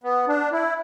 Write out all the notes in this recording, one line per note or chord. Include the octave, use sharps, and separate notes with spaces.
B3
D4
E4